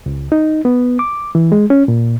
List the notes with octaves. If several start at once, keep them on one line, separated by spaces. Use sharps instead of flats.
C#2
D#4
B3
D6
E3
G#3
C#4
A#2